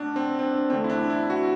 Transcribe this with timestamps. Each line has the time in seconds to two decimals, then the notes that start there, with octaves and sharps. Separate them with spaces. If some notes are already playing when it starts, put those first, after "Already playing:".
Already playing: B2 A3 D4
0.16 C4
0.39 C4
0.43 D4
0.70 E2 D3 A3 C4
0.84 E4
0.90 D4
1.10 E4
1.30 F#4